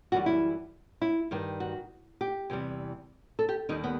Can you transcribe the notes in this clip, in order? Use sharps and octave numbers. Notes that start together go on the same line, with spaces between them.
F#2 E3 G3 F#4
E4
E4
G2 D#3 G3
F#4
G4
E2 C3 E3 G3
A4
G4
D#2 D#3 G3 D#4
B3